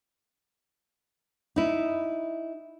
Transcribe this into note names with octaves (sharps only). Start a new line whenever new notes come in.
D#4 E4